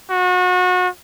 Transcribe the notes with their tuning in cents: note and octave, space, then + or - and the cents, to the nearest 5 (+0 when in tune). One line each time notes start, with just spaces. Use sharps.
F#4 -30